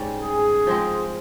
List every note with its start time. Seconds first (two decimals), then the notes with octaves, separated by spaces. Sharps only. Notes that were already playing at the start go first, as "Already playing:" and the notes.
Already playing: G#2 G3 C#4 G4
0.22 G#4
0.67 F3 G#3 C4